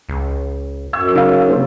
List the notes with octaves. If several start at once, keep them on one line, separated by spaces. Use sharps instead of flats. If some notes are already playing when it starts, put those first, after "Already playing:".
C#2
F#2 C#6 E6 G#6
C#3 D#4 F5
C3 A#3 C4